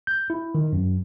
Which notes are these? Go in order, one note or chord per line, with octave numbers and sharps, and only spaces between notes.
G6
E4
D#3
F#2